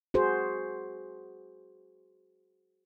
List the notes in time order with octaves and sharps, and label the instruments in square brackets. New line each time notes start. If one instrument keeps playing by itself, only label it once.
[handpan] F#4 G#4 C5